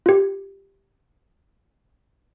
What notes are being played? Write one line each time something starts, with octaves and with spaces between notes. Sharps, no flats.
F4 G4